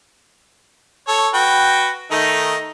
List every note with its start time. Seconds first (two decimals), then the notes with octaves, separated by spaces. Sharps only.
1.08 A4 C#5
1.34 F#4 B4 G5
2.11 D#3 A3 D#4